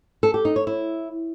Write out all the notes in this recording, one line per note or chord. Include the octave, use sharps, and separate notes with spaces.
A4
G4
D#4
C#5
E4